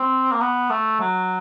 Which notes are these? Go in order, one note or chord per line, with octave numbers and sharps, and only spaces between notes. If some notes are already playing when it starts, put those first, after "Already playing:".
Already playing: C4
A#3
B3
A3
F#3